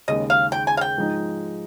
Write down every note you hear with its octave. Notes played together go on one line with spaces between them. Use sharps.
D#2 C#3 G#3 D#5
F5
G5
G#5
F5
G5
G#2 F3 G#3 D#4